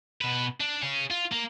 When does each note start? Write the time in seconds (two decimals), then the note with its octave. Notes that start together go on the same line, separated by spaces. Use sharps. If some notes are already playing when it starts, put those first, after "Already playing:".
0.21 B2 B4
0.60 D4
0.82 G#4 C#5
1.10 F4
1.32 A#3